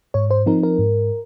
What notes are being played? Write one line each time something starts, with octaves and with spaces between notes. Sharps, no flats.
G#2 C#5
C5
F3 C4 D#4 A#4
A#4
G#2